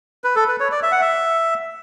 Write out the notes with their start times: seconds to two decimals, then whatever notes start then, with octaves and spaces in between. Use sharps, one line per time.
0.24 B4
0.36 A4
0.48 B4
0.60 C#5
0.72 D5
0.83 E5
0.92 F#5
1.01 E5